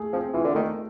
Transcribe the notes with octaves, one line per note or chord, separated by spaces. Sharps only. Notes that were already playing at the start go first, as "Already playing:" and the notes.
Already playing: A3 G#4
F3 C4
E3 F4
D3
D#3 A3